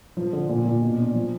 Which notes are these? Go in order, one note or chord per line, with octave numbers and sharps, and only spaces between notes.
F3
D3
A#2
A#2
B2
D4
F3